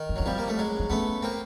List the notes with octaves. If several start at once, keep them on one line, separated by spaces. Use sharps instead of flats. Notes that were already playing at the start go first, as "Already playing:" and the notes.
Already playing: D#3
D4
F#3 C#4
F3 G3 C4
A#3
A3
F#3 G#3
D4
A3 B3 C#4
A#3 C4